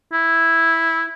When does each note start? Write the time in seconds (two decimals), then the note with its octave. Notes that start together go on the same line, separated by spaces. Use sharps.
0.13 E4